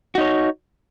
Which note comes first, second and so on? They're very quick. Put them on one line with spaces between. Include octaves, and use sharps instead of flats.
F#4 D#4 C#5